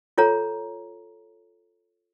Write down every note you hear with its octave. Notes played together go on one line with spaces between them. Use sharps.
F4 A4 C#5 A#5